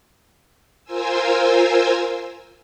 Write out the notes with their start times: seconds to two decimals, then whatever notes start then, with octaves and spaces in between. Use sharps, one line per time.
0.84 F4 A#4 C5 G#5 E6